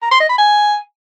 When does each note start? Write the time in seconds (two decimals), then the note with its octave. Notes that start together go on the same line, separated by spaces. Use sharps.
0.02 A#5
0.11 C6
0.20 D#5
0.29 B5
0.38 G#5